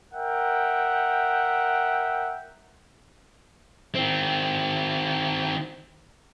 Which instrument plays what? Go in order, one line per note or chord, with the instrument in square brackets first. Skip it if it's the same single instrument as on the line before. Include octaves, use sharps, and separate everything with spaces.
[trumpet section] A#4 E5 F#5 G5
[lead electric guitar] D#3 C4